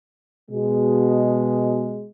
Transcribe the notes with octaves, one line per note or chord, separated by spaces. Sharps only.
B2 G#3